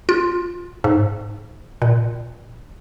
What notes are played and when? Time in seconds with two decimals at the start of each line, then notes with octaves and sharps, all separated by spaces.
0.09 F4
0.84 G#2
1.82 A#2